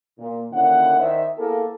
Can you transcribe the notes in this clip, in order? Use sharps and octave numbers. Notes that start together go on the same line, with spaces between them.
A#2
D#2 D3 A#3 C#4 E4 F#5
D#3 C5 D5 E5
A#3 B3 E4 G#4 A4